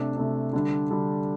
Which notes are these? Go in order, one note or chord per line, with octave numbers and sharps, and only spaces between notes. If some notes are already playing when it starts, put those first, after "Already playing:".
Already playing: C3 A3 D4
C3 A3 D4
D3 G3 D4
D3 G3 D4